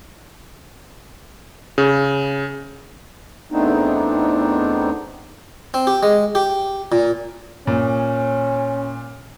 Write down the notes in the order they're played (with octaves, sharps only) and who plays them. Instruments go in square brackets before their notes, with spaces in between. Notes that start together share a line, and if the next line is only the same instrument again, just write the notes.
[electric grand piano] C#3
[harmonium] E2 A3 B3 C4 D4 D#4
[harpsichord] C4
G4
G#3
G4
A#2
[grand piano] A#2 [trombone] C#4